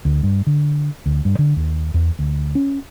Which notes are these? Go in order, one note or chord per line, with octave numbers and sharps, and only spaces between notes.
D2
G2
D3
D2
G2
D3
D#2
E2
D2
C#4